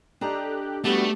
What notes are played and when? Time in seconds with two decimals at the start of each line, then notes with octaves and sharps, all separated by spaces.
0.21 D4 G4 A4 D#5 A#5 F#6
0.84 G3 A3 B3 F#4 G4